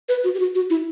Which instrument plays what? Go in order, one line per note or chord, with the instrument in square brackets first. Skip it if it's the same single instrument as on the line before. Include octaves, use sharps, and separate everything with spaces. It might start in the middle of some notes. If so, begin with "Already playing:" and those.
[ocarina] B4
F#4
G4
F#4
F#4
E4